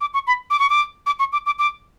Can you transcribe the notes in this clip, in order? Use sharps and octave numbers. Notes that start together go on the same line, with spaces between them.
D6
C#6
B5
D6
C#6
D6
D6
C#6
D6
D6
D6